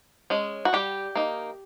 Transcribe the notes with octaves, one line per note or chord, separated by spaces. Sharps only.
G#3 C#4
F#4
G3 G4
A#3 D#4